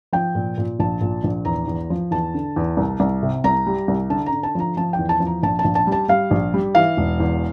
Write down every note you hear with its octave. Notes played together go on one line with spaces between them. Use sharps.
F3 G5
A#2
A#2
A#1 A5
A#2
A#1
E2 A#5
E2
F3
E2 A5
D3
E2
C2
C2
C3
C2 A#5
G3
C2
D3 A5
A#5
D3
A5
F3 A#5
F3 A5
G5
E2
A5
F3
A#5
A#1 A5
A5
A#1
A5
G3
A5
G3 F5
A#1
G3
E3 F5
E1
E2